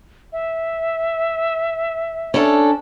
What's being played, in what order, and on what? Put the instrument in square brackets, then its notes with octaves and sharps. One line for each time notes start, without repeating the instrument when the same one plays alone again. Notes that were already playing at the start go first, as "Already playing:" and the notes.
[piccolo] E5
[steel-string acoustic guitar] C#4 D4 A4